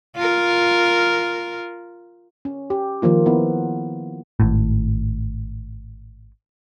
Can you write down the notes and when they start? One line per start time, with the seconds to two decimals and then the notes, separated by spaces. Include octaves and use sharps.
0.16 F4 A#4
2.45 C#4
2.70 G4
3.02 D#3 F3 A#3 F4
3.26 B3 E4
4.40 G#1 A2